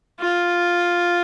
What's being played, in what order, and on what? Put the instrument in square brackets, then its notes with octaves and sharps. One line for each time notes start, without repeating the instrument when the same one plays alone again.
[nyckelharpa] F4